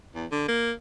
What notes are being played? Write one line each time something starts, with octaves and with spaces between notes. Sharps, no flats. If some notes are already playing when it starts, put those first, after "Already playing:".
E2
D3
A#3